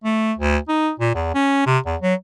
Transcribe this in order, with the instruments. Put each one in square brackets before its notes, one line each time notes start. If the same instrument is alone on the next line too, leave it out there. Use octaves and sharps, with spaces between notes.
[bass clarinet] A3
D2
D#4
A#2
E2
C#4
C3
E2
F#3